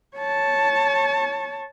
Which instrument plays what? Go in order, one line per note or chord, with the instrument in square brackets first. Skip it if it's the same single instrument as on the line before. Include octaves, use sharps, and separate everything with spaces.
[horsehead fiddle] C#5 A5